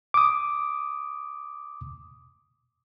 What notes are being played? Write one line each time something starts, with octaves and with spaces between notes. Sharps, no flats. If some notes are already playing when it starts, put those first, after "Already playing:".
D6 D#6